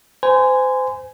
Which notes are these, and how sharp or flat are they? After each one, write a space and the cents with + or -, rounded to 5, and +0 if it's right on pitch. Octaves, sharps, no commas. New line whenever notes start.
C5 -30 G#5 -5